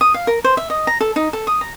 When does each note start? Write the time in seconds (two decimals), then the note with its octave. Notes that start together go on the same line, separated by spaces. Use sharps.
0.01 D#6
0.14 F5
0.27 A#4
0.44 C5
0.57 E5
0.70 D#5
0.87 A#5
1.01 A4
1.16 D#4
1.33 A4
1.47 D#6
1.61 A#5